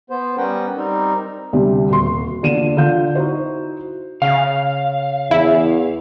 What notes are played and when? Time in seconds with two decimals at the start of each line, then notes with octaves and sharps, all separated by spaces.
0.10 B3 C5
0.37 G3 B3 C#4 A#4 F#5 G5
0.76 G3 C4 D#4 A#4
1.53 D2 C3 G3
1.90 D#1 F#4 C6
2.43 A#2 D3 D4 D#7 E7
2.77 D3 F4 F5 G6
3.15 D#4 E4 F#4 C5
4.22 C#3 F5
5.31 E2 E4